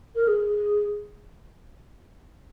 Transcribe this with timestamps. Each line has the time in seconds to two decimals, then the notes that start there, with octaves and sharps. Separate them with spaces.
0.16 A#4
0.28 G#4